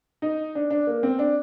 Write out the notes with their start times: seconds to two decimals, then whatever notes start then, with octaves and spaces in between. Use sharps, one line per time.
0.22 D#4
0.55 D4
0.70 D4
0.87 A#3
1.03 C4
1.19 D4